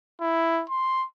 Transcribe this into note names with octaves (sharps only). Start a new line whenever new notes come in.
E4
C6